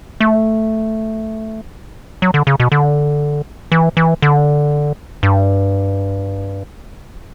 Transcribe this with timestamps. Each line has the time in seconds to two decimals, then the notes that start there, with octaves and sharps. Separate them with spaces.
0.20 A3
2.22 F#3
2.34 D3
2.47 C#3
2.60 B2
2.72 D3
3.72 E3
3.97 E3
4.22 D3
5.23 G2